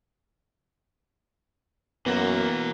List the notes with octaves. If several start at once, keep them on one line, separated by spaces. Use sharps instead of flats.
F#2 E3 A#3 B3 F#4